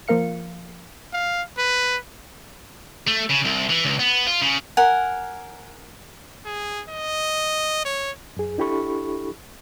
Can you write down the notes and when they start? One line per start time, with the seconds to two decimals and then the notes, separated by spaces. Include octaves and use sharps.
0.08 F3 A#3 A#4 F5 C#7
1.13 F5
1.58 B4
3.08 A3
3.30 C#3
3.45 C2
3.70 E3
3.85 C#2
3.99 B3
4.27 F4
4.41 C#3
4.77 A#4 F#5 G#5
6.46 G#4
6.90 D#5
7.85 C#5
8.37 F#2 G#4
8.58 D4 E4 G4 A4 B5 C#6